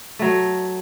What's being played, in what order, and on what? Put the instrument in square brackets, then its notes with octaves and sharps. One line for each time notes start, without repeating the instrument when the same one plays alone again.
[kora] F#3 A3